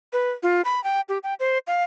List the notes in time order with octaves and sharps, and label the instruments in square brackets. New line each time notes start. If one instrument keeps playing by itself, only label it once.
[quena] B4
F4
B5
G5
G4
G5
C5
F5